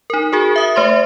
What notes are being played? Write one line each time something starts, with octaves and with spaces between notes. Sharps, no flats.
D#4 A#4
F#4 G#4 A#4
E5 D#6
A3 C5 E5 C6